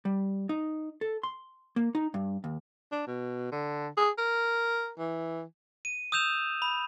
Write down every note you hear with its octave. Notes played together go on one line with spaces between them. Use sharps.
G3
D#4
A4
C6
A#3
D#4
G2
D#2
D4
B2
D3
G#4
A#4
E3
D#7
D#6 E6 G6 E7 F7
B5